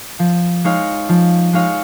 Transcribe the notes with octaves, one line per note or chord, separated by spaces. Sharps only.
F3
G#3 D#4 C#5 F5
F3
G#3 D#4 C#5 F5